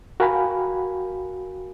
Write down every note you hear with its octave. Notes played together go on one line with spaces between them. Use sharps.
F#4 A#4 F5 G5 G#5 B5